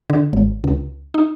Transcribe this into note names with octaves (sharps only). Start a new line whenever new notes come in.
D3
G#1
C#2
D#4